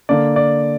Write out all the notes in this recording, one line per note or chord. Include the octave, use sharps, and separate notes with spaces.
D3 A#3 D4 D5
D5